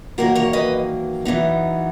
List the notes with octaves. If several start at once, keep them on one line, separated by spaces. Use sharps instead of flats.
E2 D#3 F#3 A#3 F#4 A#4
A#4 C#5
B4 D#5
F#2 E3 B3 D#4